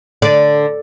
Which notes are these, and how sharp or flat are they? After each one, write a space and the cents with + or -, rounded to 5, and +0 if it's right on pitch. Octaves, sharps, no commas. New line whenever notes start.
D3 +0 D5 +0